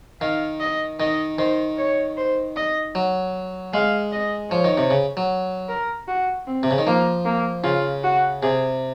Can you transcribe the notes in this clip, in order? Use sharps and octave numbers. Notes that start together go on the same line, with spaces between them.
D#3 F5
D#5
D#3 D#5
D#3 C5
C#5
C5
D#5
F#3
G#3 F5
D#5
F3 C#5
D#3
C3
C#3
F#3
A#4
F#4
C4
C3
C#3
D#3
F3 A#3
A#3
C#3 F4
F#4
C3 G#4